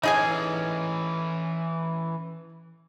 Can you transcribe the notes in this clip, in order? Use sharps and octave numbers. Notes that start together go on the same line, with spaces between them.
E3 C#4 D#4 G#4 G#5